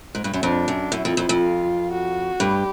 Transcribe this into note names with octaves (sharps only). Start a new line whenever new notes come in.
G#2
G2
F#2
F2 D4
F#2
F#2 E4
F2
F2
F2
F4
F#4
G2 G4